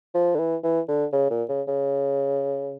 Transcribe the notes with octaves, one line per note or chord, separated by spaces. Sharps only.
F3
D3
E3
E3
D3
C#3
A#2
C#3
C#3